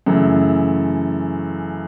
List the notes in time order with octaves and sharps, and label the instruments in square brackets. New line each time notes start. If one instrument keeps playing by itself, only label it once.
[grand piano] F#2 C#3 E3 A3